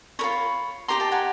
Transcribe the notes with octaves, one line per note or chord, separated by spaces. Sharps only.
F4 A#4 C#5 B5 C#6
D#4 G4 B4 A#5 C6
G5 A5
F#5 G#5